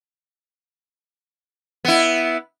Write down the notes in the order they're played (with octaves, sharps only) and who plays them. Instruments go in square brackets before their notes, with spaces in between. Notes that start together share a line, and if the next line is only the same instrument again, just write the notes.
[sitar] B3 E4